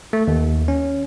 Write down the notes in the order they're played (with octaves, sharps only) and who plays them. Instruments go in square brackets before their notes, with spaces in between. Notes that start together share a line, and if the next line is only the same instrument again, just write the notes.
[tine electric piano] A3
D#2
C#4